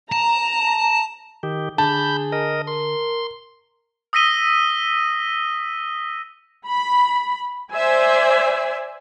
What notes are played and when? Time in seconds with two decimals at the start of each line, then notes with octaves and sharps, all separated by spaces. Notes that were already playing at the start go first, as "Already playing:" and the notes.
0.12 A5 A#5
1.43 D#3 G4
1.78 D3 G#4 A5 B5 G6
2.32 A#4 D#5
2.67 A#4 C6
4.13 D#6 E6 A#6 B6 D#7 G7
6.67 B5
7.73 C5 D5 E5 G#5